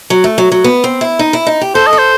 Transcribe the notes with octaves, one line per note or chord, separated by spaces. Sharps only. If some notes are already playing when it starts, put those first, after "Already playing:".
F#3
A3
F#3
F#3
B3
C4
E4
D#4
E4
D#4
G4
A4 C5
D#5
A4
C5